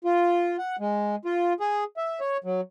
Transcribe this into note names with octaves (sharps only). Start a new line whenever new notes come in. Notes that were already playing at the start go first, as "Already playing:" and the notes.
F4
F#5
G#3
F4
G#4
E5
C#5
F#3